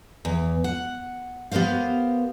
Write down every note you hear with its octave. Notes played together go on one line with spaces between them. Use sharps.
E2
F#5
B3 G4 A#4 C5 F5